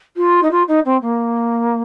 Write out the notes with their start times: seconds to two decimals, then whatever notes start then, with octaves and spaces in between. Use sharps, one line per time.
0.16 F4
0.42 D#4
0.51 F4
0.68 D#4
0.85 C4
1.01 A#3